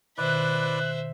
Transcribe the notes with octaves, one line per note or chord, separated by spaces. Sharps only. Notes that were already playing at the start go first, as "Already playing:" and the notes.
B2 D#3 E4 B4 C5 D5 E5 F#6